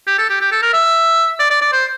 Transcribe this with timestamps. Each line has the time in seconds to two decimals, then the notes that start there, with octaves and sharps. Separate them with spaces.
0.07 G4
0.18 A4
0.30 G4
0.41 G4
0.52 A4
0.62 A#4
0.74 E5
1.40 D5
1.51 D5
1.61 D5
1.73 C5